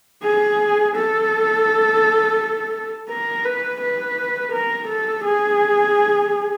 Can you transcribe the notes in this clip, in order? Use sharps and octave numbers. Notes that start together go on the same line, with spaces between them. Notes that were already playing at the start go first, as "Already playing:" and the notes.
G#4
A4
A#4
B4
B4
A#4
A4
G#4